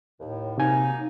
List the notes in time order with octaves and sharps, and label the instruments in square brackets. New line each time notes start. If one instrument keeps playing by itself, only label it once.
[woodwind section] D#2 A2
[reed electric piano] C3 G#5 [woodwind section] F#3 A#3 D#4